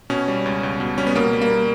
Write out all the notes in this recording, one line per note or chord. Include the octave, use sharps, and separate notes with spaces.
B2 C#4
G3
C#2
C#2
B2
G3 C#4
B3
B2 A#3
G3
A#3